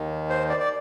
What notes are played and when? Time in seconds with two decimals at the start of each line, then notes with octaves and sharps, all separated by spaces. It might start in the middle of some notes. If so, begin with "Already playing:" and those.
Already playing: D#2 D#3
0.30 C5
0.49 D5
0.60 D5